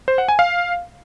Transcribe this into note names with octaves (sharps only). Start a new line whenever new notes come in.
C5
F#5
G#5
F5